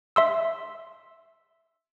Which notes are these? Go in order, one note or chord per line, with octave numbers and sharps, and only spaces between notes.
E5 C6 E6